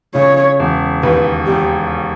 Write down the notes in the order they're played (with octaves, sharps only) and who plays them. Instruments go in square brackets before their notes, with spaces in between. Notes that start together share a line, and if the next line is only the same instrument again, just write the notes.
[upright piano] C#3 [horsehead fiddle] C#5
[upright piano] E1
[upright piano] D#2 [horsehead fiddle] B4
[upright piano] E1 [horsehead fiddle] G4